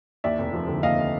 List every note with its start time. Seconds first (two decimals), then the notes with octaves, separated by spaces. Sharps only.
0.24 D#2 D5 E5
0.39 F1
0.53 F3
0.68 D3
0.83 D#2 D#5 F5